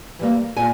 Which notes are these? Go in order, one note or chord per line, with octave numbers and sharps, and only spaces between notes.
E3 G3 A#3
A#2 G#5